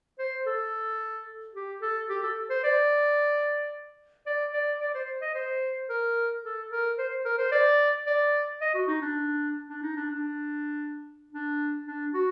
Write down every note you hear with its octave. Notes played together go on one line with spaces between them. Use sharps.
C5
A4
G4
A4
G4
A4
C5
D5
D5
D5
D5
C5
D#5
C5
A#4
A4
A#4
C5
A#4
C5
D5
D5
D#5
F#4
D#4
D4
D4
D#4
D4
D4
D4
D4
F#4